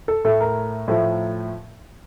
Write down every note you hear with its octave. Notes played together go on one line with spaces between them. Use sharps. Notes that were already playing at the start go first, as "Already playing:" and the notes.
A4
A2 A3 A4
A#4
A2 F3 A3